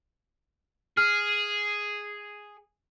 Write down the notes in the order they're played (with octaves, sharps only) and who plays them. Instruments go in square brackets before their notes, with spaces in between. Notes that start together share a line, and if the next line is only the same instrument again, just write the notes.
[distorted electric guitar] G#4 [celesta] F6